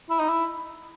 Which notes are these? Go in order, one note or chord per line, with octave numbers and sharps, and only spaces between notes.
E4
D#4
E4